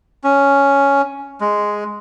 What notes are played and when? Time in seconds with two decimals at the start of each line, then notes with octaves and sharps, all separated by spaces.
0.24 C#4
1.41 G#3